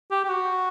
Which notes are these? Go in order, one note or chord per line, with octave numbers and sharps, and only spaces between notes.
G4
G4
F#4